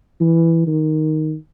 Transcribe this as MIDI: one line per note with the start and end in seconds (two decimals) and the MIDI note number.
0.21 0.62 52
0.67 1.35 51